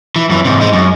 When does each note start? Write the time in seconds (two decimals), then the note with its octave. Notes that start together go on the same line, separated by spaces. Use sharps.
0.16 E3
0.29 F#2 E3
0.45 G#2 C3
0.60 G#3 D#4
0.73 F#2